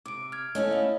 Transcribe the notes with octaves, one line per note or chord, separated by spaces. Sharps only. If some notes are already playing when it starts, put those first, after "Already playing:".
C3 D6 D7
F6 G#6
A3 C#4 E4 C#5 D#5
D#5 F5